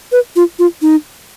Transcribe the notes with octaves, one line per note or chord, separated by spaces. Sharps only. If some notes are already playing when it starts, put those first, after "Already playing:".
B4
F4
F4
D#4